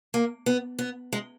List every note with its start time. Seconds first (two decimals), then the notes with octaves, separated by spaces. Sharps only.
0.14 A#3
0.46 B3
0.79 B3
1.13 G#3